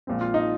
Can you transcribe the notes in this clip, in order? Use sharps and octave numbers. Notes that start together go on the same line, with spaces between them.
A#1 A#2 F3 G#3 C4
F4
D#4